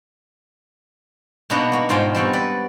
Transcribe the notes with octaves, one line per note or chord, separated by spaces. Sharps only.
B2 A#3 B3 D4 D#4 F#4
A#3 F#4
G#2 B2 F4 C5 G5 G#5
G3 B3 C4 F#4
B4 D5